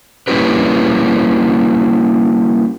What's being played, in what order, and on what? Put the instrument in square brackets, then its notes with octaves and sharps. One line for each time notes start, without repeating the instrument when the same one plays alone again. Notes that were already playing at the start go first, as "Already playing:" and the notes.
[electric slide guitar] G3 A#3 C#4 E4 G4 B4